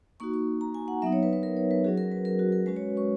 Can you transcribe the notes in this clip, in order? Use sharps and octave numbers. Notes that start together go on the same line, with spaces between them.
A#3 D#4 F#4 C#6
C#6
A#5
G#5
F#5
F#3 B3 D#4 E5
C#5
B4
B4
A#4
C#5
B4
F#3 C#4 F#4 G#4
A#4
B4
A#4
F#4
A#4
G#3 C#4 F#4 B4
C#5
C#6